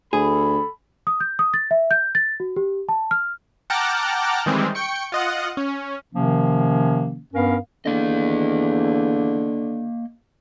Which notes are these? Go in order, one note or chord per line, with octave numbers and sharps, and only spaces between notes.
D2 G#4 A4 B5
D#6
G6
D#6
A6
E5
G6
A6
F#4
G4
A5
F6
F#5 G5 A5 A#5 D6 F6
D#3 E3 G3 G#3 C4
G5 C#6 C#7
F4 D#5 F#5
C#4
C3 D#3 F3 A#3 C#4
G2 B3 C#4 A#4 F5
E2 D3 A#3 D#5